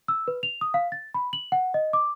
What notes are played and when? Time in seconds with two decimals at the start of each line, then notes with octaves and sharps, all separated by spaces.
0.08 E6
0.28 B4
0.43 F7
0.61 D#6
0.74 F5
0.92 A6
1.14 B5
1.33 F#7
1.52 F#5
1.74 D#5
1.93 D6